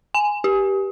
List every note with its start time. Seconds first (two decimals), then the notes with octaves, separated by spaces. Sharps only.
0.14 G#5
0.44 G4